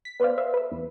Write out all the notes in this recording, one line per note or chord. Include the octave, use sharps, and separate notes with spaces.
B6
B3 B4 C5 D5 F5
C5 E5 F5
B4 E5
E2